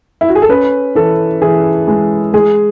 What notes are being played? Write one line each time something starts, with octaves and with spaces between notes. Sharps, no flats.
E4
F#4
G#4
A4
C#4 B4
E3 A4
E3 G#4
G#3
G#3 G#4